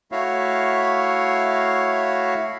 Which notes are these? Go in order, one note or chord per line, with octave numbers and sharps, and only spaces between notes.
A3 E4 F#4 C#5 E5 F5